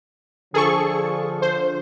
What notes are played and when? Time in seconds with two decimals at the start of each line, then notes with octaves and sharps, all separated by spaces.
0.54 D3 F3 G#4 A4 C#6
1.42 C5